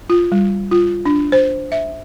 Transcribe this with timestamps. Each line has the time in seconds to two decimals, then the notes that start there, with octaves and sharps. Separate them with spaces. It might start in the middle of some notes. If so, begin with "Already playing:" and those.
0.10 F4
0.32 G3
0.71 F4
1.06 D4
1.32 C5
1.72 E5